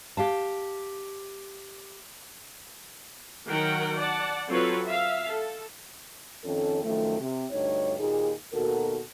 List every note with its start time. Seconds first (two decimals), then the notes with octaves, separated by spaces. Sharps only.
0.17 G4 F5 A5
3.48 D#3 F#3 A#4 F#5 G5
3.97 D5 F#5 A5
4.49 F#3 C4 F4 A4 B4 C#5
4.86 E5 F5
5.26 A4
6.44 F2 D#3 C#4 A4
6.83 F#2 D#3 F3 A3
7.19 C3
7.51 D2 G2 D3 D#4 C#5
7.99 D#2 A#2 D#4 G#4
8.52 D#2 B2 F#4 A4 A#4